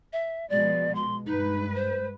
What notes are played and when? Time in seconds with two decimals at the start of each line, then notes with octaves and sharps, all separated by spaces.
0.13 E5
0.49 B2 F3 G#3 D5
0.95 C6
1.26 G2 G#3 D#4 B4
1.74 C5